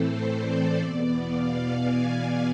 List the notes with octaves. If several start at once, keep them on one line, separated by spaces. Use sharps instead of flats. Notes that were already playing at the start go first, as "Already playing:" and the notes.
Already playing: A2 E3 A3 C4 A4 C5
D5
E2 B2 B3
F5
G#5
F5